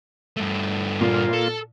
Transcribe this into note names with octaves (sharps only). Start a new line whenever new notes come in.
G2 A3
A#2 A#3 F4
A4